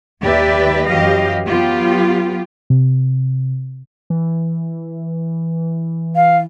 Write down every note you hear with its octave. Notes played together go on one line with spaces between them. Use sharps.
D#2 G4 B4 D5 E5
F#2 E3 F#3 G4 D#5 F5
F#3 B3 F4 G4
C3
E3
F5